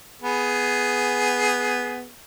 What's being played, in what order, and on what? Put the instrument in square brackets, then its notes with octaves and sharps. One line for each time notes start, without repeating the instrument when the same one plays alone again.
[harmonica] B3 G#4